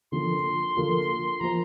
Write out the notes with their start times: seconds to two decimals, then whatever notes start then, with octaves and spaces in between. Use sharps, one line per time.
0.12 D3 F3 A#3 F4 A4 C6
0.76 D3 F3 A#3 F4 A4
1.40 F3 A#3 F4 C5 A#5